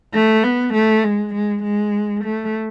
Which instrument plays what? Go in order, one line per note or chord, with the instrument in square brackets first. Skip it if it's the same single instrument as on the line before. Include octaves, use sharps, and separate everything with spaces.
[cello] A3
B3
A3
G#3
G#3
G#3
A3